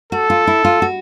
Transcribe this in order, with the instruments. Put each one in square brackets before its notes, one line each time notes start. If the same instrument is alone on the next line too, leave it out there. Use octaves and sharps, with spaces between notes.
[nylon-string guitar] F#4 [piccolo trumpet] A4
[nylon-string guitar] F4
E4
F4
F#4